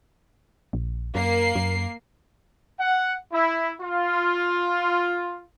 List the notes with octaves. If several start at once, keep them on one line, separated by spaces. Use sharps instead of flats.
A#1
F#2 A#3 C7
F#2
F#5
E4
F4